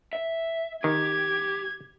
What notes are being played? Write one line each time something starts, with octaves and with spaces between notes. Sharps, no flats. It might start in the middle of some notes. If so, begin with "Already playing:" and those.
E5
D#3 G4 G#6